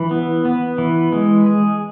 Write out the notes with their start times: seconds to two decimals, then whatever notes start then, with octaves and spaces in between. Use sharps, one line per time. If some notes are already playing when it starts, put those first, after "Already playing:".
Already playing: E3
0.11 B3
0.45 B3
0.78 E3
1.12 G#3
1.46 G#4